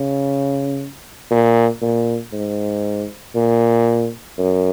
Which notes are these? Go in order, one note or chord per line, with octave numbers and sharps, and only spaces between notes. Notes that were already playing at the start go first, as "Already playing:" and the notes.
Already playing: C#3
A#2
A#2
G#2
A#2
F#2